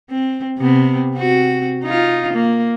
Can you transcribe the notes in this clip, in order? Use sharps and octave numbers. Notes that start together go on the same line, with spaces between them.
C4
C3 B3 C4
C4 F#4
D#4 F4
A#3